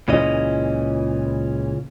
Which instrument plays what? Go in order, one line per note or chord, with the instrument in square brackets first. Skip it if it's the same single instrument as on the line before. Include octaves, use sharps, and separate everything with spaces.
[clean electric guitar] C#2 A#2 E3 C#4 D#5